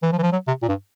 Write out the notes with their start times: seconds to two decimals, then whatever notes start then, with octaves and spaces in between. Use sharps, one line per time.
0.03 E3
0.12 F3
0.18 E3
0.23 F3
0.32 F#3
0.47 C3
0.62 A#2
0.69 G2